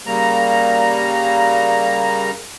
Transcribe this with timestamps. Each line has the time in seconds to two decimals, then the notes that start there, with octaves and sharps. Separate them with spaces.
0.06 C#3 G3 A#3 A#5